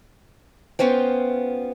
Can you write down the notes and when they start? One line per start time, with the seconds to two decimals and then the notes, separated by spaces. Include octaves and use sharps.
0.79 B3 C#4 F4 C5 G5